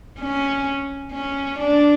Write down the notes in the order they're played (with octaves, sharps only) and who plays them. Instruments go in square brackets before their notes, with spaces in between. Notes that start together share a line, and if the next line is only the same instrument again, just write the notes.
[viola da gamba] C#4
C#4
D4